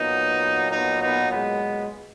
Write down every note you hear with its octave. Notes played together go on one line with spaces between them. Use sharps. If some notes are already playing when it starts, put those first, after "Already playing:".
Already playing: A#2 F#3 B3 D#4
B3 D#4
B3 D#4
G#3 B3